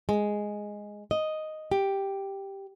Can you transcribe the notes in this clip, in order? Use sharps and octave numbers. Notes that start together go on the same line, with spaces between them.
G#3
D#5
G4